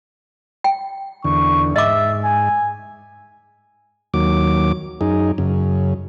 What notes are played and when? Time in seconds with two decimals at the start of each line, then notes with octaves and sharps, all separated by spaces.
0.64 G5
1.24 E2 D3 C#6
1.76 G#2 D#5 E5 D6
2.24 G#5
4.14 D#2 F#3 D6
5.01 F#2 D#4 G#4
5.38 F#2 C#3